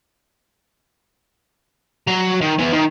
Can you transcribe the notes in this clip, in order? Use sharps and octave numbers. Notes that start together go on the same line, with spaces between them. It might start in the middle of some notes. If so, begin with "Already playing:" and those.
F#3 A#5
D#3
E3 B3
D#3